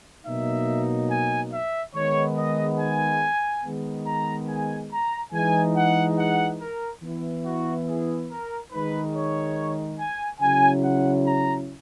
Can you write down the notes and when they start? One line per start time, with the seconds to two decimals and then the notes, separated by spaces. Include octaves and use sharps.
0.24 B2 F#3 A#3 D#4 E5
1.09 G#5
1.52 E5
1.94 D#3 G#3 B3 C#5
2.36 D#5
2.78 G#5
3.63 D#3 G#3 B3
4.05 A#5
4.48 G#5
4.90 A#5
5.33 E3 G#3 D#4 G#5
5.75 F#5
6.18 F#5
6.59 A#4
7.02 E3 B3 E4
7.44 F#4
7.86 G#4
8.29 A#4
8.71 D#3 G#3 D#4 B4
9.14 C#5
9.98 G#5
10.40 C#3 F#3 C#4 E4 G#5
10.82 F#5
11.25 A#5